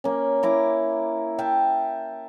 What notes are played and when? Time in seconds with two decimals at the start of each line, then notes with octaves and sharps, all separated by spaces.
0.04 A#3 C#4
0.43 E4 A#5 D6
1.38 E5 F5 G5 A5